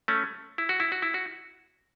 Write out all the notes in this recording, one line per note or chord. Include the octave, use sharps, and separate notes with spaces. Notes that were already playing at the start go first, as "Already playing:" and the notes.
A3 C#4
E4
F#4
E4
F#4
E4
F#4